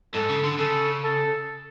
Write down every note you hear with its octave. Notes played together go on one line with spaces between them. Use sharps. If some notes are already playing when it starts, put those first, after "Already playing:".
G#2 A4
C#3
D3
C#3 A4
A4